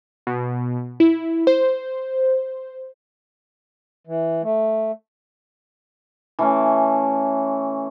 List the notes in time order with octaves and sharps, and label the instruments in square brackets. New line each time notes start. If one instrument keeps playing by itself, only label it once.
[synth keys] B2
E4
C5
[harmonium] E3
A3
[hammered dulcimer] E3 A3 C#4